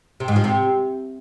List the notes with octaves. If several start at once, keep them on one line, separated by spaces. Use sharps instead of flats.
C3
G#2
F3
C3